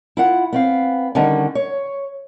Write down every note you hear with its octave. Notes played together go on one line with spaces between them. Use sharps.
E4 F4 F#5
B3 C4 F5
D3 D#3 G3 C#4 F#5
C#5